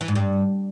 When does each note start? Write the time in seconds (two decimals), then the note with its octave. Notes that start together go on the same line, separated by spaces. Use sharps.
0.01 E3
0.08 G#2
0.15 G2